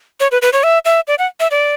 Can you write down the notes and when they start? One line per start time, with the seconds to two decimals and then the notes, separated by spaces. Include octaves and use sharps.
0.20 C#5
0.32 B4
0.42 B4
0.53 C#5
0.63 E5
0.85 E5
1.07 D5
1.19 F#5
1.40 E5
1.51 D5